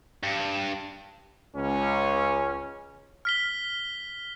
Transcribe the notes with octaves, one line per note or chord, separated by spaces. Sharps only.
G2
C#2 C#4
F6 B6 G7